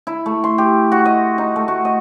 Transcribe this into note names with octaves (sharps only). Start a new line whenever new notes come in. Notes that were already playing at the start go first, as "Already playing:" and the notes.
E4
A3
C6
G4
F#4
D#5
D#4
A3
F#4
D#5